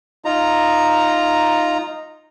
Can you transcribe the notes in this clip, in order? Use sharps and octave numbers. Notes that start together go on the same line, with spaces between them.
D#4 F4 A#5